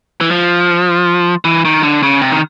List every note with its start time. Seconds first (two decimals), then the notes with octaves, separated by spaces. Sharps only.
0.21 E3
0.31 F3
1.45 E3
1.65 D#3
1.83 D3
2.03 C#3
2.21 C3
2.32 D#3